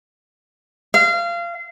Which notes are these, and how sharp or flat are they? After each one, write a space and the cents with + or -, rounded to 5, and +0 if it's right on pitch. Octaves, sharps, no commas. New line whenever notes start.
F5 -25